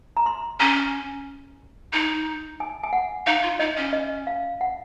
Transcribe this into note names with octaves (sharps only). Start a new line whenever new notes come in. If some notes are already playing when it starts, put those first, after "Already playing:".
A#5
C6
C#4 A#5
D#4
G#5
G#5
F#5
D#4 F5
F4
D#4 D#5
C#4
D#5
F5
F#5